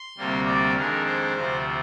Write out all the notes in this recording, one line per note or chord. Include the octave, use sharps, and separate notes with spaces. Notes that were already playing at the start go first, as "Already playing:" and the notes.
Already playing: C6
D2 C3 G3 A#3
D5
F2 D#3 G#3 D4 A#4
C5
D2 C3 F3 C4